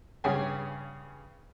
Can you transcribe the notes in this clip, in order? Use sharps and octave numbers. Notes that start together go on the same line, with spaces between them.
G2 C#3 G4 G#4 C#5 G#5